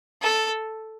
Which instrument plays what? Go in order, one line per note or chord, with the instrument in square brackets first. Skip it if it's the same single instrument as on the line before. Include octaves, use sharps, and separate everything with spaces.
[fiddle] A4